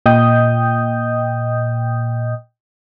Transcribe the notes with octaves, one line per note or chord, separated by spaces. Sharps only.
A#2 D#5 G5 D#6 G6